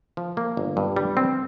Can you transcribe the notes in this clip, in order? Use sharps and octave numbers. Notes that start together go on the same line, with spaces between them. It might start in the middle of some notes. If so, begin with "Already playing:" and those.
F3
A#3
G1
G2
G3
C4